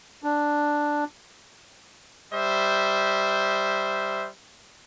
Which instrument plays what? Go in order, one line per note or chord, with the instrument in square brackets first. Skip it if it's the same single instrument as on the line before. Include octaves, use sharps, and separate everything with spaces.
[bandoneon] D4
[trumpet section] G3 C5 E5